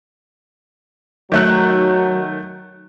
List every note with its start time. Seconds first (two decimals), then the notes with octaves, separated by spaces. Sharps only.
1.32 D#3 F#3 A3 F#6